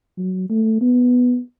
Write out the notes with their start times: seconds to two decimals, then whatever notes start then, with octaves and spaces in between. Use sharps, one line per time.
0.17 F#3
0.49 A3
0.81 B3